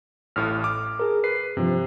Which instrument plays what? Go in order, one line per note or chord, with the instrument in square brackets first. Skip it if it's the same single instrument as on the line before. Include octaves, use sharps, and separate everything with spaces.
[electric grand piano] A1 A2 [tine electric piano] F6
[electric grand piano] D6 [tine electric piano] F6
[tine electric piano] G#4 A#4
[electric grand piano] B4 [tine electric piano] C7
[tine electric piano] G2 F3 [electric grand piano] C3